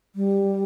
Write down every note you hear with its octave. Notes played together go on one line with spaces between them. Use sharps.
G3